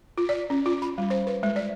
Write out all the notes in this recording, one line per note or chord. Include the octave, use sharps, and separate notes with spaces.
F4
D5
C#4
F4
B5
G3
C5
B4
G#3
D5